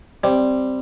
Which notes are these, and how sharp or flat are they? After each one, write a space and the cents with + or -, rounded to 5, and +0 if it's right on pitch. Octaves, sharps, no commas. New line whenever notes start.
G3 +0 C4 +0